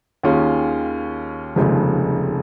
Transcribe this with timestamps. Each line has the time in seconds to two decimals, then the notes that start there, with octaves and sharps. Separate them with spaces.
0.23 D#2 D#3 C#4 F4 G#4
1.56 F1 D#2 C#3 F3 G#3